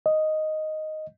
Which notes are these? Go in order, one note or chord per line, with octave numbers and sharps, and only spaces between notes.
D#5